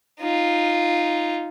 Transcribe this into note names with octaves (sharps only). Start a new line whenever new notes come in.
D#4 F4